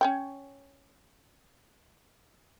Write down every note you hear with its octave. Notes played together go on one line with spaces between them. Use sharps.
C#4 C#5 G5